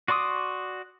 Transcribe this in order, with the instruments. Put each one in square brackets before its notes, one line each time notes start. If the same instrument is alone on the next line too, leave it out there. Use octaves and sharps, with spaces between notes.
[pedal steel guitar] F#4 D5 C6 D6 D#6